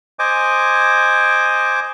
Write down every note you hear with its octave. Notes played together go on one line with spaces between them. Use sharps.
C5 D#5 G#5 D6